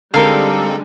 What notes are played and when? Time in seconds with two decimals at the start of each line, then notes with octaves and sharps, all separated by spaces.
0.14 D3 G3 G#3 C4 D#4 A4 A#4 F5